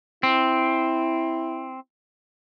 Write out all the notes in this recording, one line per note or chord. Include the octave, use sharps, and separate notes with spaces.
C4 E4